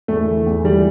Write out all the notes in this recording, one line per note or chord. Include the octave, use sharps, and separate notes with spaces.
E2 A3
E3
E2
E3 G3